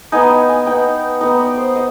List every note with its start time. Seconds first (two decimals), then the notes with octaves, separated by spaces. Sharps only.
0.12 B3 D#4 G#5
0.30 G5
0.49 G#5
0.66 B3 D#4 G5
1.21 B3 D#4 D#5
1.40 D5
1.57 C5
1.76 D#5